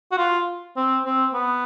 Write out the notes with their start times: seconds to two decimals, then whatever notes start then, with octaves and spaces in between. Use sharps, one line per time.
0.12 F#4
0.18 F4
0.77 C4
1.05 C4
1.34 B3